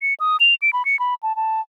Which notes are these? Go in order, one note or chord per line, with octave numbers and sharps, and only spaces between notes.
C#7
D#6
F7
D7
B5
C#7
B5
A5
A5